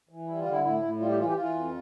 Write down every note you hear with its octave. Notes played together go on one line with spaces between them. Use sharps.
E3
G3 E4
F4
D3
E4
A2 E4
A2
G3 F4
G4
E3 F4
G4
E3 F4
F2